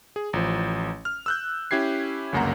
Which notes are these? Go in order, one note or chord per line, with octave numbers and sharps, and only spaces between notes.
G#4
A1 F3
F6
E6 F#6 G6
C#4 E4 G4 G#6 C7
G1 C#2 F#2 A#3 F#5 A#5